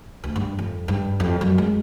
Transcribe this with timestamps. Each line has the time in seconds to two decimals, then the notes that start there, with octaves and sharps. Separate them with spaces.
0.24 D2
0.36 G2
0.59 F2
0.88 G2
1.20 F2
1.41 F#2
1.58 G#3